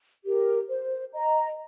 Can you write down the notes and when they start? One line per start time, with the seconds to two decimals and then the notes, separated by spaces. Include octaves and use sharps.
0.24 G4 A#4
0.69 C5
1.13 D#5 A#5